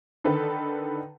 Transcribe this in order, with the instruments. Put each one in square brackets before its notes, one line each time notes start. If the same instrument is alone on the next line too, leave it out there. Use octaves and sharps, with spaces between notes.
[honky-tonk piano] D3 D#3 A4 B4